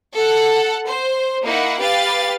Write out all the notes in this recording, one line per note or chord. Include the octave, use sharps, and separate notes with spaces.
A4 F#5
C5
A#3 D#4 E4 F#5
G4 B4 F5 A6